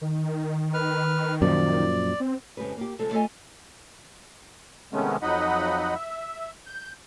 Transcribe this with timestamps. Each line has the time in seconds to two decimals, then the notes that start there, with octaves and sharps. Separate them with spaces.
0.01 D#3
0.74 B4 F6
1.42 F#2 A#2 F3 D5
2.20 C4
2.57 F2 C#3 G#3 G4 B4
2.77 A#3 G4
2.99 C3 F3 G#3 A4
3.12 A3 F4 A4 A#4 D#5 G#5
4.93 C3 D#3 G#3 A3 B3 C#4
5.22 F2 F#3 D#4 D#5 F#5 B5
5.95 E5
6.67 G6